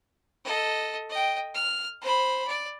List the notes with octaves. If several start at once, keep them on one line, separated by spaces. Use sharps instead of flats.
A4 D#5
D#5 G5
F6
C5 B5
D5